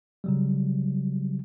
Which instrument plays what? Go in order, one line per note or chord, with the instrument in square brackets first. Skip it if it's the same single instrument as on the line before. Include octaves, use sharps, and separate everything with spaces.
[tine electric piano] C#3 F#3 G3